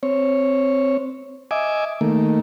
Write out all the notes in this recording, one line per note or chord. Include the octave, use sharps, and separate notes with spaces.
C4 C#5
D#5 E5 G#5 D6
D#3 A3 A#3